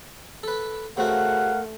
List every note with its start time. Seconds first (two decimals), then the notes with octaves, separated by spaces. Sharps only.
0.43 A4 B4
0.97 C#3 A3 C4 F#4 A#4 F5 F#5